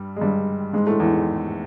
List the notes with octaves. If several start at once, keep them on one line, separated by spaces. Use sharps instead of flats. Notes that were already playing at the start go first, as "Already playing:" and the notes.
Already playing: G2 G3
G#3
G2 G3
G#2 G#3
A2 A3
E2 E3
D#3